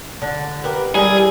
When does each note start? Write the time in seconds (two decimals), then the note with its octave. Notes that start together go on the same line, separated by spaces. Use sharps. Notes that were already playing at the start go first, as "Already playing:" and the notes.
0.22 D3
0.64 G4 A#4 B4
0.95 G3 E4 G#4 A#4